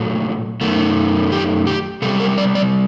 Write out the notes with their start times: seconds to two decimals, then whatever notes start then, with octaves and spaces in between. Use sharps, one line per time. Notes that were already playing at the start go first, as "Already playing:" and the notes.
Already playing: A#2 F#3 A3
0.61 F#2 D#3 A3
1.32 G4
1.67 G4
2.02 C3 G3 A4
2.20 A#4
2.38 D5
2.55 D5